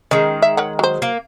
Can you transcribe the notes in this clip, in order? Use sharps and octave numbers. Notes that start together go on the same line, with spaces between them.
D#3 G#3 C#4
E5
A#4 C#5 F#5
F#3 C5
A#3